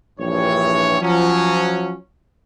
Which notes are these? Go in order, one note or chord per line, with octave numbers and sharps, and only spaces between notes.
A#1 G2 E3 C#5
F3 F#3 C#4